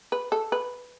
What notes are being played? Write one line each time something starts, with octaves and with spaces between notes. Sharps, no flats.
B4
A4
B4